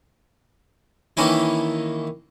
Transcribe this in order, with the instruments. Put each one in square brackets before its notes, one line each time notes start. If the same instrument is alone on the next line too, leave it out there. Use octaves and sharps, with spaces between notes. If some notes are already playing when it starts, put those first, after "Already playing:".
[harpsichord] D#3 E3 A#3 C#4 D#4 E4